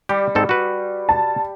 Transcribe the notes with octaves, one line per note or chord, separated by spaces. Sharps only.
G3 G4
G#2 C4 A4
F#4 B4
A5